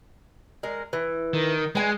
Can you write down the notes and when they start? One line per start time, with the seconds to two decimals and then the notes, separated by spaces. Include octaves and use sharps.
0.63 G#3 A#4
0.93 E3
1.33 D#3
1.75 G#3 B4 G#5